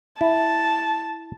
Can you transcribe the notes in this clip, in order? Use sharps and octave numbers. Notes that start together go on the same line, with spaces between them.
E4 A5